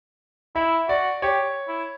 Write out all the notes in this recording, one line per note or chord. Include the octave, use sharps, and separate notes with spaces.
E4 E5
F#4 D5
G4 C#5
E4